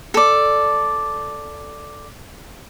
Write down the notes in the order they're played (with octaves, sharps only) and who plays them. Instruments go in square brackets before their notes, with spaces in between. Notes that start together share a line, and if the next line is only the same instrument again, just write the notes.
[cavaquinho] A4 D5